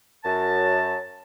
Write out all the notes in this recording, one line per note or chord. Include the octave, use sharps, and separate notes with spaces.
F#2 A5